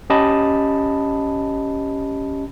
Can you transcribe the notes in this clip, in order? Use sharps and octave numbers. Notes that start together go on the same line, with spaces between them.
C#4 G4 D#5 A5 B5